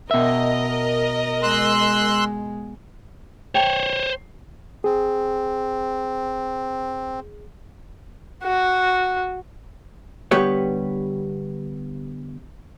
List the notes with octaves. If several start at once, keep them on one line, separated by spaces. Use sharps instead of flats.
B2 A#4 D#5 E5
G#3 C6 E6 F#6
C5 C#5 G5 A5
C4 G#4
F#4
D3 G3 B3 G4 B4 C#5